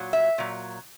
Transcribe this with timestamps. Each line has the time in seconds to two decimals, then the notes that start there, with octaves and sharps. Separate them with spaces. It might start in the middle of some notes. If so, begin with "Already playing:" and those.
Already playing: A#2 F#3
0.13 E5
0.38 A#2 F#3